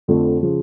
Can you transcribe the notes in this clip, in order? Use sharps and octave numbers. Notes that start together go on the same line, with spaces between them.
F2 D3 F3 A3
C#3 F3